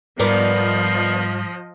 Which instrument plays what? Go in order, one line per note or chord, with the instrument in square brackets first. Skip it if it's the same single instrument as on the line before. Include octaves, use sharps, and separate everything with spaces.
[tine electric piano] G#2 G3 [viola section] F3 D#5 [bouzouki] B3 A#4 D5